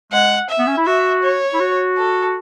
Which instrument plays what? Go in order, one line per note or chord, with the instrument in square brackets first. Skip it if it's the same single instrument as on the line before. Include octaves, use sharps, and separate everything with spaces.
[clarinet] G#3 [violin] F#5
[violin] E5
[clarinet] B3
C#4
E4
[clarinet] F#4 [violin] E5
[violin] C#5
[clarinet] E4
F#4
[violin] A4